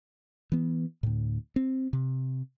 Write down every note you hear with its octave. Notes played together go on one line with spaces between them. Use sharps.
E3 B3
D2 A2
C4
C3